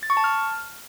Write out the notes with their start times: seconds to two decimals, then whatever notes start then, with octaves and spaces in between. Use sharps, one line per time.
0.03 A6
0.10 C#6
0.17 A5
0.24 F6